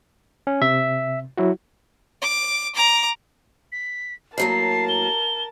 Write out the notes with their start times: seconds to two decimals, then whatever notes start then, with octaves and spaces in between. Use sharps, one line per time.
0.47 C#4
0.62 C3 E5
1.38 F#3 E4 F#4
2.22 D6
2.75 A#5 D6
3.72 B6
4.38 A2 F#3 A#3 A#4 A5 C7
4.89 G7